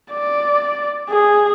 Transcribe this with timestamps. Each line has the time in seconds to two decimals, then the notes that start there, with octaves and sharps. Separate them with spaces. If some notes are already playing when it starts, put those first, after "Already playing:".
0.13 D5
1.10 G#4